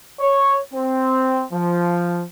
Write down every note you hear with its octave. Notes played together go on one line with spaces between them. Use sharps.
C#5
C4
F3